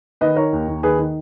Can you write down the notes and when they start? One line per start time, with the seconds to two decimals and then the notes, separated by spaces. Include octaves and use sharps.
0.21 D#3 B4 D#5
0.36 D#3 A#4 C#5
0.52 D#2
0.68 D#2
0.83 D#3 G#4 B4
0.98 D#3